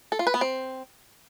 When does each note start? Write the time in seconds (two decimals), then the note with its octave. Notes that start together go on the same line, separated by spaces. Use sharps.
0.12 A4
0.19 F4
0.27 B4
0.34 B3
0.41 C4